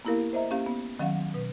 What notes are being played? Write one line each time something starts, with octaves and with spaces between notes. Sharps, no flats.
A#3 B3 E4 G4 A#4 F5
C5 D#5 E5 A#5
A#3 C#4 G4 F5
B3
D#3 F#3 C#4 F5 F#5
B2 B4